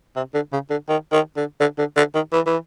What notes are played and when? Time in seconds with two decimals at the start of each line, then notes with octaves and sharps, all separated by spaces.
0.16 C3
0.34 D3
0.53 C#3
0.70 D3
0.89 D#3
1.12 D#3
1.37 D3
1.60 D3
1.78 D3
1.97 D3
2.15 D#3
2.33 E3
2.46 E3